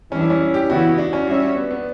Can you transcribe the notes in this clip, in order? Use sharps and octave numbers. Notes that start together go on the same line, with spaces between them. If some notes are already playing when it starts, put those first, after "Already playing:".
E3 G3 C#4 D4
E4
C#4
D4
G4
C#3 E3 B3 E4 F#4
D4
C#4
G3 C#4 D4 F#4 C#5 E5
B3
B3